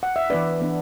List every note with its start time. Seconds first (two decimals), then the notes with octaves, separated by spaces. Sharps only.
0.03 F#5
0.16 E5
0.30 E3 B3 D4 B4 D5
0.61 E3 B3 D4